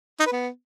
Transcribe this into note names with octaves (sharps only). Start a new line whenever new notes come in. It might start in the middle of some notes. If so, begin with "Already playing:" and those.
D#4
B4
B3